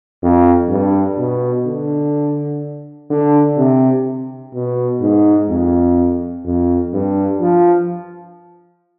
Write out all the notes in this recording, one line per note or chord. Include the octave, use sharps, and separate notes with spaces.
F2
G2
B2
D3
D3
C3
B2
G#2
F2
F2
G2
F3